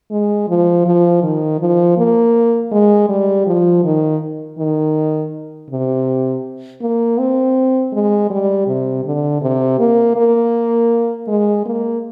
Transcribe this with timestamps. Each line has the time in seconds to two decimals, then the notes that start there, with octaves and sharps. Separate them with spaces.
0.11 G#3
0.48 F3
0.86 F3
1.23 D#3
1.60 F3
1.98 A#3
2.72 G#3
3.09 G3
3.46 F3
3.84 D#3
4.58 D#3
5.70 C3
6.82 A#3
7.18 C4
7.93 G#3
8.30 G3
8.67 C3
9.05 D3
9.42 C3
9.79 A#3
10.17 A#3
11.28 G#3
11.66 A#3